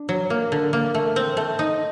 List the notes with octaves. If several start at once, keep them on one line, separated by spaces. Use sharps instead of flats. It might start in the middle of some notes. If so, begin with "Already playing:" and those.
Already playing: D4
F#3
A#3
D3
A#3
A3
C4
A3
D#4